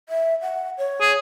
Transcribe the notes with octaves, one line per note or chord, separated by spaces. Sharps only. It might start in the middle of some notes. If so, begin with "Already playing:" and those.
E5
F#5
C#5
G#4